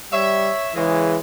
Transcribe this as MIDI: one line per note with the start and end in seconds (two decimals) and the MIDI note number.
0.12 0.52 55
0.12 0.71 73
0.12 0.71 76
0.76 1.18 49
0.76 1.18 52
0.76 1.18 56